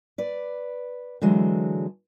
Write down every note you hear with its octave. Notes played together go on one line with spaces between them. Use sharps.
B4 D5
D3 E3 F#3 G#3